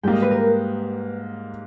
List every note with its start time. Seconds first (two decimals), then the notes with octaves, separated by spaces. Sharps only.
0.03 G#2 G3 A#3 G5
0.13 D#5
0.22 B4
0.31 A#4
0.39 B4